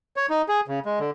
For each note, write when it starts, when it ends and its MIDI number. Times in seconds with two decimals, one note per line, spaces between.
0.16 0.26 73
0.30 0.42 63
0.49 0.61 68
0.68 0.79 49
0.85 0.99 56
1.00 1.11 50